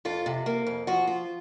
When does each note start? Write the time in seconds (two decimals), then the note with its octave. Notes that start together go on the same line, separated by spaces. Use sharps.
0.05 F2 F4 A4
0.26 C3
0.46 A#3
0.67 F2
0.87 F3 F#4
1.07 F4